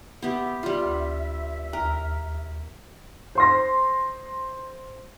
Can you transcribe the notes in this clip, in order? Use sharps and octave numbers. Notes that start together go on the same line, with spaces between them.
B3 G4 E5
G3 F4
D2
D#2 A#4
C5 C6 A#6